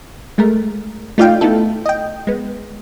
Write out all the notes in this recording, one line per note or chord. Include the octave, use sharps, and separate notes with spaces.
G#3 A3 A#4
A3 D#4 F4 D5 F5 G5
A3 B3 D#4 E4 A4
D#5 G5
G#3 B3